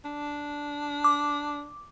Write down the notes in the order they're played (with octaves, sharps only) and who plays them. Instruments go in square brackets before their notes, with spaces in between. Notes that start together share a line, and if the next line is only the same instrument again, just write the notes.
[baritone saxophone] D4
[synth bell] D6